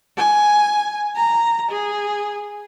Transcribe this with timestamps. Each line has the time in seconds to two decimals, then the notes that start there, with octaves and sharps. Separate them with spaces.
0.17 G#5
1.17 A#5
1.71 G#4